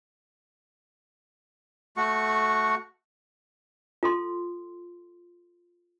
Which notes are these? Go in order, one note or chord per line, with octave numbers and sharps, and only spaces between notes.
A3 F#4 C#6
F4 A4 C6